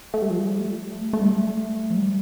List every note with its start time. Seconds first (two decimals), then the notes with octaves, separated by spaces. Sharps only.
0.14 A3
0.22 G3
0.30 F3
0.39 G3
0.59 A3
1.13 A3
1.21 G3
1.29 A3
1.90 F3
1.96 G3